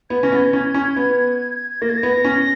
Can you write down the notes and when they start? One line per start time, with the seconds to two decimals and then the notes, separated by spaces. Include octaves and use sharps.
0.10 B3 G#6
0.23 C#4 A#6
0.32 B3
0.37 G#6
0.53 C#4
0.74 C#4
0.96 B3
1.82 A#3 A#6
1.89 G#6
1.97 A#6
2.03 B3
2.24 C#4